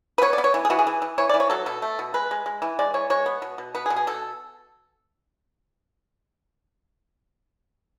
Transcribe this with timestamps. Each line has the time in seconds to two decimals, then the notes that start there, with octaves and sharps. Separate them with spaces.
0.18 B4
0.22 B3 C#5
0.33 D5
0.38 B3
0.44 C#5
0.54 E3
0.65 G#4
0.70 E3 F#4
0.79 G#4
0.87 E3
1.02 E3
1.18 E3 C#5
1.29 D5
1.34 E3
1.40 C#5
1.50 F#3 A4
1.66 B2 A4
1.82 A3
1.99 B2
2.14 G#3 B4
2.31 G#3
2.46 G#3
2.62 E3
2.79 G#3 D5
2.94 E3 C#5
3.10 G#3 C#5
3.26 B3
3.42 B2
3.58 B2
3.75 B3 B4
3.86 G#4
3.90 B2
3.96 G#4
4.07 B2 A4